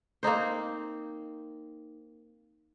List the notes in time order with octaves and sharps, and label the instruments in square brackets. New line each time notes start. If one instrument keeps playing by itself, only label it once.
[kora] A#3 C4 D#4 C5